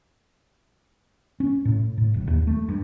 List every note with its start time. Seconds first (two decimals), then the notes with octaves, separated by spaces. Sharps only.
1.40 C#4
1.65 A2
1.98 A2
2.14 D1
2.27 D#2
2.47 A3
2.69 G2